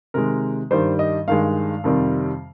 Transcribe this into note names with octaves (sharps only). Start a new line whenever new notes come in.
C3 D#3 G#3 A#4
G2 D#3 G3 C5
D#5
G2 D#3 G#3 F5
F2 C3 D#3 G3